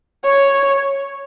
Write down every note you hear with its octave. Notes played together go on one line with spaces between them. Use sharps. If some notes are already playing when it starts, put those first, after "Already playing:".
C#5